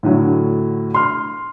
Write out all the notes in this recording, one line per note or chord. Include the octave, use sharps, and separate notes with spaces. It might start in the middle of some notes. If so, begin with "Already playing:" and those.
A2 D3 F#3
C6 F6